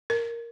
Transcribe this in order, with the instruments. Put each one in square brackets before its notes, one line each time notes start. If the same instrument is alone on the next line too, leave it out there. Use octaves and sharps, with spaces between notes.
[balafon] A#4